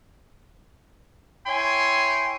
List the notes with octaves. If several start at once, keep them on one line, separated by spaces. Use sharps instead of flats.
E4 C#5 G5 G#5 C6